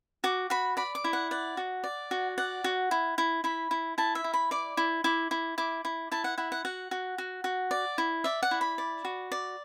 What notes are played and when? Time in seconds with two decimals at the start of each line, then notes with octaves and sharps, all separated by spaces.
0.24 F#4 D6
0.50 F#4 B5
0.77 D5 B5
0.95 D6
1.04 E4
1.13 F#5
1.31 D5 F#5
1.57 F#4
1.84 D5
2.11 F#4
2.38 D5 F#5
2.64 F#4
2.91 E4
3.18 E4
3.44 E4 B5
3.71 E4
3.98 E4 A5
4.15 E5
4.24 E4
4.34 B5
4.51 D5 D6
4.77 E4
5.04 E4 D6
5.31 E4
5.58 E4 D6
5.85 E4
6.12 E4 A5
6.24 F#5
6.38 E4 F#5
6.52 F#5
6.65 F#4 F#5
6.91 F#4
7.18 F#4
7.44 F#4
7.71 D5
7.98 E4
8.24 D5 E5
8.43 F#5
8.51 E4
8.61 B5
8.78 D5
9.05 F#4
9.32 D5